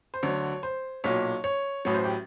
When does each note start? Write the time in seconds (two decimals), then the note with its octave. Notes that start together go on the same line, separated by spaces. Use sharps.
0.14 C5
0.23 D2 D3 F#3 C#5
0.63 C5
1.04 B1 A#2 F#3 C#5
1.44 C#5
1.85 A1 A2 F#3 C#5
1.95 C5
2.05 G4